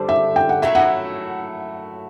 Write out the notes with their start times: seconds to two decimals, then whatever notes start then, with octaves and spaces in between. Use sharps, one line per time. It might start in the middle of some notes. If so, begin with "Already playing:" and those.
Already playing: D3 G3 D4 A4 C5
0.09 E5
0.36 G5
0.49 F#5
0.62 F#3 A3 E4 E5
0.75 F#5